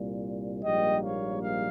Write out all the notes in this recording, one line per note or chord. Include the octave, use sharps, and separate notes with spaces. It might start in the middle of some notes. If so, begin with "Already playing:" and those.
Already playing: C2 A#2 G3
A#1 G#2 G3 A#3 D#5 G5
C#5 F5
F5